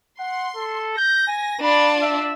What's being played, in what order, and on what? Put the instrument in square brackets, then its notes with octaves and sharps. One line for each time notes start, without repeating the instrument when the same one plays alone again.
[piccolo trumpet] F#5 [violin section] C6
[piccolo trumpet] A4
[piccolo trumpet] G6 [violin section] A#6
[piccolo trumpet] G#5
[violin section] D4 F4 D5 [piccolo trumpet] B5
[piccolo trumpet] E5